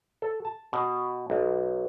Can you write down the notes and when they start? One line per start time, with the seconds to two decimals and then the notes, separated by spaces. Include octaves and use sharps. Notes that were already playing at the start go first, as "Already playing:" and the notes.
0.22 A4
0.45 A5
0.73 B2
1.30 B1